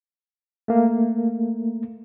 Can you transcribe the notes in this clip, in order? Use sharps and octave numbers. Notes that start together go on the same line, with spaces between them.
A3 A#3